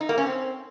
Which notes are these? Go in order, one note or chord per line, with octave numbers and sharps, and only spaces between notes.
D#4
A#3
C#4
C4